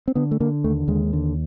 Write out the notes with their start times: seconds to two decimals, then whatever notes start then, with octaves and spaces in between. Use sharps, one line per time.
0.08 C4
0.15 D3 B3
0.31 A3
0.40 D3 A#3
0.64 D#2 A3
0.88 D#2 G#3
1.13 D3